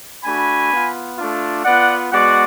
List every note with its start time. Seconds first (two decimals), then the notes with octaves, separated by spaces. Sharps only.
0.24 A3 D4 F#4 G#5 B5
0.71 B3 F4
1.18 A3 D4 F4
1.65 B3 F4 D5 F#5
2.12 G#3 B3 F#4 D5 F#5